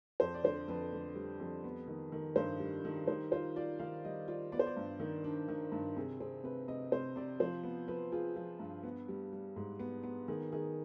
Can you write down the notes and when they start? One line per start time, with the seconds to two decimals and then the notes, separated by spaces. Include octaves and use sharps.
0.20 F2 C5
0.34 D5
0.44 D3 C5
0.68 F2 B4
0.93 D3
1.16 G3
1.40 F2
1.64 B3
1.88 D#3
2.12 D#3
2.36 G2 C5
2.60 G3
2.85 D#3
3.08 D#3 C5
3.32 F4 C5
3.56 F4 D5
3.80 D#3 F5
4.05 G3 D#5
4.28 F4 D5
4.52 B3 D5
4.59 C5
4.66 D5
4.77 G2
5.00 D#3
5.24 D4
5.48 D#3
5.72 G2
5.97 C3 G#4
6.20 C4 G#4
6.44 C3 B4
6.68 C3 D#5
6.92 C3 C5
7.16 C3 D5
7.40 F3 C5
7.63 B3
7.88 F3 B4
8.12 F4 G#4
8.36 F3
8.59 G2
8.83 B3
9.08 G3
9.33 G3
9.56 G#2
9.79 B3
10.03 B3
10.28 D#3 G#4
10.52 D#3 G#4